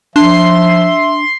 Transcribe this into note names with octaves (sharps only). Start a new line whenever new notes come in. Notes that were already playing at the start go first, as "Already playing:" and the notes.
F3 D4 E5 C6